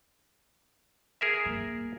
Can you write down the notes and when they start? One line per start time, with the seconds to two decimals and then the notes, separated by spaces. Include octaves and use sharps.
1.21 G#4 A#4 E5
1.46 A#3